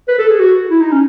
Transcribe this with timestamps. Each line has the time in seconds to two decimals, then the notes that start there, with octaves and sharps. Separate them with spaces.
0.08 B4
0.18 A4
0.29 G#4
0.39 F#4
0.70 E4
0.81 D#4
0.92 C#4